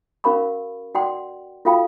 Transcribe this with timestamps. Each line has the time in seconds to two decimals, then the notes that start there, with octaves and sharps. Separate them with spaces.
0.24 C#4 F#4 A#4 F5 B5 C#6
0.95 F#4 D5 F#5 G5 C6
1.65 F4 F#4 A4 F5 G5 B5